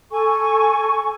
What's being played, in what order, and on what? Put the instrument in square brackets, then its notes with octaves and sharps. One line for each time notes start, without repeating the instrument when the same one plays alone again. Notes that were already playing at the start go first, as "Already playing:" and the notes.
[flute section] A4 G#5 C#6